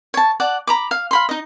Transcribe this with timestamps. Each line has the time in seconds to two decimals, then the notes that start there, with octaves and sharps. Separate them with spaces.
0.14 C#5 A5
0.40 D5 F#5 A5
0.67 A#5 B5 D6
0.91 F5
1.11 F5 B5 C6
1.29 D#4 D#5